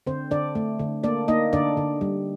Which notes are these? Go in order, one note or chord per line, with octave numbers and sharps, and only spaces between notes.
D3 C4 C5
D3 D4 D5
A3
D3
A#3 D4 D5
A#3 D#4 D#5
D3 D4 D5
D3
G3